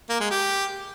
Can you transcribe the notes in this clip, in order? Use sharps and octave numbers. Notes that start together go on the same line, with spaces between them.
A#3
G#3
G4